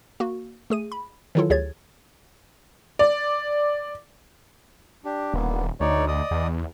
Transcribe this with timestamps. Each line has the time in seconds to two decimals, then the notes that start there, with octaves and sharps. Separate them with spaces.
0.20 A#3 F#4
0.70 A3 G#4 D#7
0.92 B5
1.35 D#3 E3 F#3 E4 F4 A4
1.50 D2 G4 G#4 C#5 G#6 A6
2.99 D5
5.05 D4 G4
5.33 D#1 D3 A#3 B3
5.80 D2 D#4 C#5 D5
6.08 D5 D#5 D#6
6.31 E2